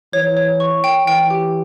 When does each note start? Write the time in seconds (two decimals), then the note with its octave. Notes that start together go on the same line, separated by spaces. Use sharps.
0.13 E3 C#5
0.37 C#5
0.60 C#6
0.84 G5
1.07 E3 G5
1.30 G4